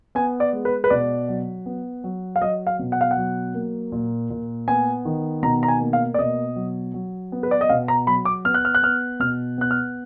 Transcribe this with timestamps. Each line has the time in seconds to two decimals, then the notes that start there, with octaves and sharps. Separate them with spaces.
0.15 B3 G#5
0.40 D5
0.53 G#3
0.65 B4
0.84 B4
0.90 B2 D5
1.29 F#3
1.66 B3
2.04 F#3
2.36 F5
2.41 F#3 D#5
2.67 F5
2.79 B2
2.92 F#5
3.01 F5
3.11 F#5
3.17 F#3
3.55 A#3
3.92 A#2
4.30 A#2
4.68 B3 G#5
5.05 D#3
5.43 B2 A#5
5.63 A#5
5.68 G#5
5.81 A#3
5.93 F5
6.14 D5
6.19 B2 D#5
6.56 F#3
6.94 F#3
7.32 B3
7.43 B4
7.51 D5
7.61 D#5
7.69 B2 F5
7.88 A#5
8.07 F#3 B5
8.25 D6
8.45 B3 F6
8.54 F#6
8.65 F6
8.75 F#6
8.83 B3 F6
9.20 B2 F6
9.58 B3 F#6
9.71 F6